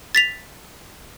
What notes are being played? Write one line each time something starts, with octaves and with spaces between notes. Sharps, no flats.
A6 B6 F7